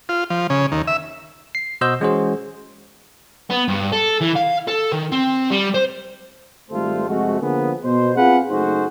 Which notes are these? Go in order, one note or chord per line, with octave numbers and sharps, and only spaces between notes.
F4
F3
C#3
D#2
E5
C7
B2 F#4 C5 D#5 E6 G6
E3 G#3 C#4 F#4 G#4 C5
B3
G2
A4
E3
F5
A4
D#3
C4
G3
C5
G#1 G3 A3 F4 A4 C5
F2 C3 G#3 A3 F#4
D3 F3 A#3 B3 G#4
B2 C5
C4 F4 G#4 B4 F5 F#5
F#1 A3 D#4 F#4 G#4 C5